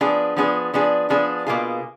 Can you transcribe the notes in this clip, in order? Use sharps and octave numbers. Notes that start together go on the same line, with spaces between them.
F3 B3 D4 G#4
F3 B3 D4 G#4
F3 B3 D4 G#4
F3 B3 D4 G#4
B2 A#3 F4 G#4